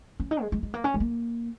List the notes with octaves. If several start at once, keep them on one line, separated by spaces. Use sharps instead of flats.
C#4
D#4
G#3
G#3
G#3
A#3
C#4
G#3
A#3